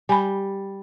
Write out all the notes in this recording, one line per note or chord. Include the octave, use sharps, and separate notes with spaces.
G3 G#5 B5